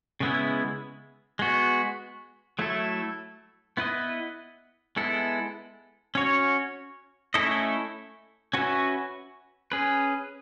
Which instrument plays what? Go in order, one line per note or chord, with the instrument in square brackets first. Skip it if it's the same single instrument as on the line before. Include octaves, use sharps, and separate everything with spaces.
[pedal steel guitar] C#3 G#3 B3 E4
G#3 B3 F#4
F#3 A3 E4 A4
B3 E4 B4 D#5
G#3 B3 E4 A4
C#4 F#4 C#5
A3 C#4 E4 A4 D#5
C#4 F#4 B4 E5
C#4 G#4 B4